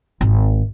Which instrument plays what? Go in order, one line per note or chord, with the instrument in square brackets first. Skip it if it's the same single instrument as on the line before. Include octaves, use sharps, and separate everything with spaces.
[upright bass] G#1